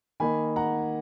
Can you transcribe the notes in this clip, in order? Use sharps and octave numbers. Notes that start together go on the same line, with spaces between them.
D#3 A#3 D#4 G#5 B5
F#5 A#5